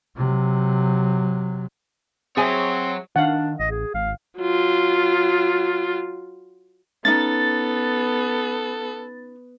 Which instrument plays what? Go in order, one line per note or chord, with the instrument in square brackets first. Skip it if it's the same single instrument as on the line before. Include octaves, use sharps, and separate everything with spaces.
[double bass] C3 F#3
[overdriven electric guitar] F#3 C#5 [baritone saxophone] C4 [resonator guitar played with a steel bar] G#4 E5 G#5
[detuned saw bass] D#3 [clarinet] D4 [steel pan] F5 F#5
[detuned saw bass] A1 [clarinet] D#5
[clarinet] G#4
[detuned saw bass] G#1 [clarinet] F5
[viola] F#3 F4
[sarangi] B3 [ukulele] C#4 D#4 [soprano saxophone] A4 [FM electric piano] A6